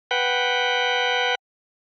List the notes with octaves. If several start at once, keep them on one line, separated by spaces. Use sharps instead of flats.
B4 F#5 G5